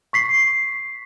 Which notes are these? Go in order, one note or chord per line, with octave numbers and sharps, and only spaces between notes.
C#6 B6 C7